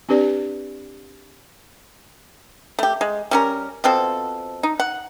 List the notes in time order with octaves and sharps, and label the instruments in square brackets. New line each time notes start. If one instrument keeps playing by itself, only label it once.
[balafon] C4 D4 G4 B4 D5
[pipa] A3 G4
G#3
G3 C#4 A#4
B2 F3 C4 A4
D#4
F#5